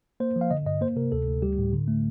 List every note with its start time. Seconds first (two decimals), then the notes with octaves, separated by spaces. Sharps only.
0.20 A#3 C5
0.36 F3
0.41 F5
0.51 D3 D#5
0.66 G2 D#5
0.81 A#3 C5
0.96 C3 A#4
1.12 D2 A4
1.27 D2
1.42 G3 G4
1.58 A2
1.73 D3
1.88 A3